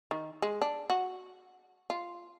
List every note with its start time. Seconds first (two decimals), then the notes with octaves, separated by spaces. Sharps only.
0.11 D#3
0.42 G#3
0.61 D4
0.90 F#4
1.90 F4